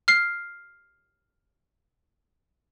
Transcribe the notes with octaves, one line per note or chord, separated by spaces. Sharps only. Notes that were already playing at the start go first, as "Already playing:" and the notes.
F6 C7